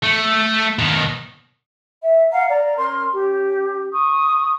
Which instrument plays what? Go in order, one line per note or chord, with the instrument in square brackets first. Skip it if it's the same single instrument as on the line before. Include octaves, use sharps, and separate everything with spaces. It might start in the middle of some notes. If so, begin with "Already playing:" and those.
[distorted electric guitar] A3
B2 D#3
[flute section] E5
F5 F#5 A#5
D5 A#5
C#4 A#4 C6 F6
C#4 G4
C#6 D#6